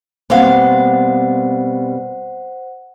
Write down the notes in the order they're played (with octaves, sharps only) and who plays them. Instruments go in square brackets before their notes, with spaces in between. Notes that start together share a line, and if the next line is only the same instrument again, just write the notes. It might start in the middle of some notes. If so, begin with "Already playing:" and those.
[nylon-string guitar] B2 A#3 [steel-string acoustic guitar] G3 C4 F5 [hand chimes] C5 F#5